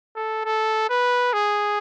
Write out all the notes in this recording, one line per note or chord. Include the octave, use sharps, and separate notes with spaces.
A4
A4
B4
G#4